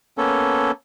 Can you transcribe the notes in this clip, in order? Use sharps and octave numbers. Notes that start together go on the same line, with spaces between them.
A#3 B3 C#4 A4